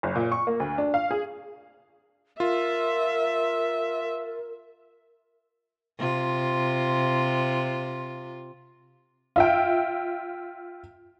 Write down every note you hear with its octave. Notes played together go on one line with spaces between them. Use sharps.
F#1
A#2
C#6
A#3
D2
D4
F5
G#4
F4 A#4 E5
C3 F4
F4 E5 G5